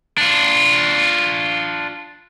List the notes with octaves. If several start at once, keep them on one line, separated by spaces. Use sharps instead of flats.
D4 F4